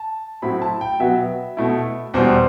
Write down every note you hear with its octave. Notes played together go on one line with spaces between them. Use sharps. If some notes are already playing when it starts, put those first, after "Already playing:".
Already playing: A5
A2 F#3 C4 E4 B5
A5
G5
B2 F#3 B3 E5
B2 A3 E4
E2 B2 G3 C5